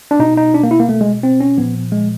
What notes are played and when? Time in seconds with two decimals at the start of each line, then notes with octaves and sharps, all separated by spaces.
0.11 D4
0.19 B2 D#4
0.37 D#4
0.54 D4
0.63 A#3
0.71 E4
0.80 A#3
0.89 A3
1.01 G#3
1.23 C4
1.40 C#4
1.57 A#2 F3 B3
1.92 G#3